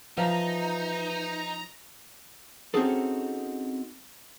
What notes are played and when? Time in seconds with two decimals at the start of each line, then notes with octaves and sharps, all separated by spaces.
0.17 E3 F3 D#4 A#5
2.74 C4 C#4 D#4 F#4 G#4 A4